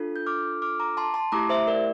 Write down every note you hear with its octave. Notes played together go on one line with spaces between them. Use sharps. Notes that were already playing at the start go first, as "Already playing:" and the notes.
Already playing: D4 F4 A4
G6
D6 F6
D6 F6
A#5 D6
A5 C6
A5 C6
A3 E4 G4 A#5 D6
C5 E5
A#4 D5